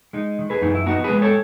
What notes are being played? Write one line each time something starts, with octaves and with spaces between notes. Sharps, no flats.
G#3 D#4
D#3
G#4 B4
F#2 D#4
E4
B3 D#4 F#4
G#4 B4
G#3
A4 C#5